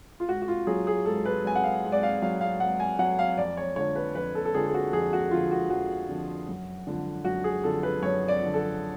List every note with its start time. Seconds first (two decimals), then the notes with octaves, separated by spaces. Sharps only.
0.20 F4
0.28 G#2 F#4
0.42 F#4
0.48 F4
0.67 F#3 G#4
0.87 G#4
1.06 G#2 A4
1.26 B4
1.45 F#3 G#5
1.55 F#5
1.64 F5
1.84 G#2
1.92 D5
2.03 F5
2.22 F#3 F5
2.41 F5
2.60 G#2 F#5
2.80 G#5
2.99 F#3 F#5
3.19 F5
3.38 F2 D5
3.57 C#5
3.76 D3 F3 C#5
3.96 B4
4.15 F2 B4
4.35 A4
4.45 A4
4.54 D3 F3 G#4
4.67 G#4
4.74 F#4
4.93 F2 G#4
5.13 F#4
5.31 D3 F3 F4
5.51 F#4
5.70 F2 F#4
6.09 D3 F3
6.48 F#2
6.87 D3 F3
7.25 F#2 F#4
7.44 G#4
7.64 D3 F3 A4
7.83 B4
8.02 F#2 C#5
8.28 D5
8.41 D3 F3
8.54 A4